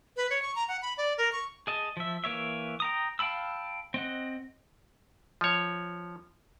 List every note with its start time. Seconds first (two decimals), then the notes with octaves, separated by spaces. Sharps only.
0.17 B4
0.30 C#5
0.42 C#6
0.56 A#5
0.69 F#5
0.82 B5
0.98 D5
1.18 A#4
1.32 C#6
1.67 G#4 D#5 A5
1.97 F3 E5
2.24 E3 A#3 C#5 E5
2.80 G5 A#5 D#6
3.19 F5 G5 A5 B5 E6
3.94 C4 D#5 F#5
5.41 F3 C#5